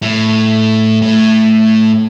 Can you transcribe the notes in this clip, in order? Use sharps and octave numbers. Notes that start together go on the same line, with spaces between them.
A2
A2